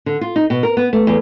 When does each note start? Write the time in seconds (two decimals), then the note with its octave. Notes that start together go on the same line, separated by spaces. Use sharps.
0.06 D3
0.21 F4
0.36 D#4
0.50 B2
0.63 A#4
0.77 B3
0.93 A3
1.07 E2